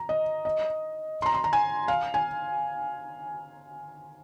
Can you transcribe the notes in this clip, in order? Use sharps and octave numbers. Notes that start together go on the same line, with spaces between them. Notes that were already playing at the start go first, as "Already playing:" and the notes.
Already playing: A#5
D#5
D#5
C6
A#5
C6
A#5
G#5
F5
G#5